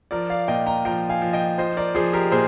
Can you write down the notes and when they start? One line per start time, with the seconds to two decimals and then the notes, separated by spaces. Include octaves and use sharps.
0.11 F3 A#4 D5
0.30 D5 F5
0.48 A#2 D#5 G5
0.66 G5 A#5
0.85 F3 G5 A#5
1.09 F5 G#5
1.22 F3
1.33 D#5 G5
1.58 F3 C5 D#5
1.77 A#4 D5
1.95 F3 G#4 C5
2.13 G4 A#4
2.32 A#2 G#4 C5